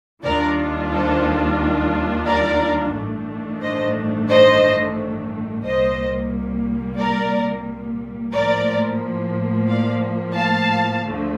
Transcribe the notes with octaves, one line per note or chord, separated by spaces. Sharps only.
D#2 D#3 G3 D4 F4 A#4 D5
A4 C5
A#4 D5
A1 G2 D#3 A3 D4
C5 D#5
C5 D#5
C2 A#2 G3 A#3 C5 D#5
A#4 D5
A2 F3 A#3 A#4 D5
D5 F5
F5 A5
D2 D3 F3 A3